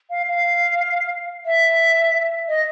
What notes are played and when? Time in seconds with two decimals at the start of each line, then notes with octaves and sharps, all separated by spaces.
0.10 F5
0.26 F5
1.45 E5
2.48 D#5